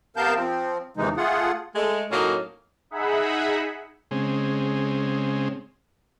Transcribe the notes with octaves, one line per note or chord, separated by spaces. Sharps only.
C3 B3 A#4 F5 A5 G6
F3 C4
D#2 C3 E3 G#3 D#4
A3 F4 G#4 F#5
G#3 A3
A2 F#3 A#3 C#4 D#4
D#4 G#4 E5 F#5 B5
C#3 G#3 C4